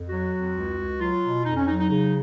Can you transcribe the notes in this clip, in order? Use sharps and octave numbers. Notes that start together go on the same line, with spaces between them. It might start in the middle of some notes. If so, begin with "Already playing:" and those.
Already playing: F2
F#3 F#4
F2
C#2
C#2
F#3 F4
B2
F2 D#4
C#4
F#3 D#4
D#4
C#3 D#4